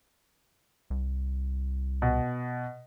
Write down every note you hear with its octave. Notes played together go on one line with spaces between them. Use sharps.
C2
B2